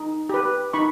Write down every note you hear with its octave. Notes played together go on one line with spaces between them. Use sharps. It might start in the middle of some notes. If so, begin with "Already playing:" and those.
Already playing: D#4
G4 B4
D#4 B5 C#6